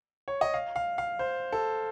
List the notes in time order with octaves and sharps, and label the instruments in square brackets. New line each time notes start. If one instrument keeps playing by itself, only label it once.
[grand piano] C#5
D#5
F5
F5
F5
C5
A4